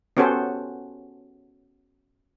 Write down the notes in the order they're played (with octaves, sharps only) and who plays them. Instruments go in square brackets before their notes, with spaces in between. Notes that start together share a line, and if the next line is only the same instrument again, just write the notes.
[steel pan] B3 C#4 F#4 G4 A4 C5